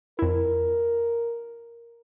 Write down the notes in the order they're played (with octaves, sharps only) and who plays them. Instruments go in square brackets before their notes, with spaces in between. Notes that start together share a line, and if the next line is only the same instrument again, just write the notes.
[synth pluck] F2 E4 [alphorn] A#4